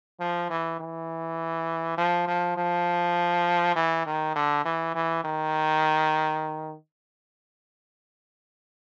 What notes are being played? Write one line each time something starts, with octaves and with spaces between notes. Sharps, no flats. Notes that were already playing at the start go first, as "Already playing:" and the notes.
F3
E3
E3
F3
F3
F3
E3
D#3
D3
E3
E3
D#3